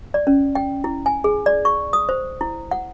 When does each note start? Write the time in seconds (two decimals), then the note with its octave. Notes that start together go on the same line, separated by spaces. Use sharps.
0.14 D5
0.27 C#4
0.55 G5
0.84 E4
1.06 G#5
1.24 G#4
1.46 D5
1.65 C#6
1.93 D#6
2.09 C5
2.41 E4
2.71 F#5